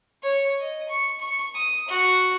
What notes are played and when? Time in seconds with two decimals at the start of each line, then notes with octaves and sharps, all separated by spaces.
0.23 C#5
0.60 D#5
0.89 C#6
1.20 C#6
1.55 D#6
1.89 F#4